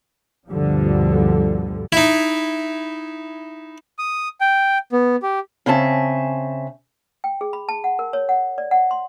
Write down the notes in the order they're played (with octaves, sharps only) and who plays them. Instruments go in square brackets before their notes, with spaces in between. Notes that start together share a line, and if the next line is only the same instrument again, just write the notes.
[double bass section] D2 G2 B2 D3 F3 G3
[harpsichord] D#4 E4
[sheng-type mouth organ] D#6
G5
B3
G4
[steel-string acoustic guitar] C#3 C4 C#4 E5 A5
[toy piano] G5
G#4
B5
A5
F#5
A#4
C#5
F#5
D5
F#5
C6